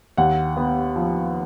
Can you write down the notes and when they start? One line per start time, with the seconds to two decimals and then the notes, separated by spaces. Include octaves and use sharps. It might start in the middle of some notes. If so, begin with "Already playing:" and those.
0.17 D#2 F#5
0.57 B3
0.96 F3